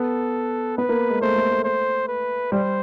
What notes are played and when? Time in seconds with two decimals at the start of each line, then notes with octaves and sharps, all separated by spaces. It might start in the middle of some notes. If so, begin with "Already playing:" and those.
Already playing: B3 A4
0.78 B3 B4
0.89 A#3
1.10 G#3
1.21 A3 C5
1.36 A3
1.51 A3
1.65 C5
2.08 B4
2.52 G3 C5